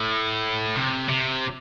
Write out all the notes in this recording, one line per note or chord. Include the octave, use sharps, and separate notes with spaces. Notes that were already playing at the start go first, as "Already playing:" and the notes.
Already playing: A2
C3
C3